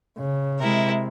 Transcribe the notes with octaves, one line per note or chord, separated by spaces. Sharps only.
C#3
C3 G#3 E4 A#4